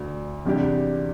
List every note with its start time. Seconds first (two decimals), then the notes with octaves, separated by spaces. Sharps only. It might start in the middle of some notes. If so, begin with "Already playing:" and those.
Already playing: D2 D3 D4
0.45 E2 C3 G3 D4 G4